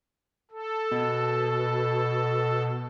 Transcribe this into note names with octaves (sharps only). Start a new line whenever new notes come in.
A4
B2